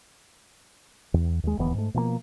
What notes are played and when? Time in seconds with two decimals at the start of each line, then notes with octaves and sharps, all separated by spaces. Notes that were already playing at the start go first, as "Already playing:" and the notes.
1.14 E2
1.43 D#2 G#3
1.58 D1 D#2 E3 B3
1.74 G#2 A3
1.94 B2 F3 F#3 A#3